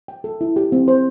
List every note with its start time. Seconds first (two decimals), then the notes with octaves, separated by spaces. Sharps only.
0.08 G5
0.24 A4
0.41 E4
0.56 G4
0.72 C4
0.88 C5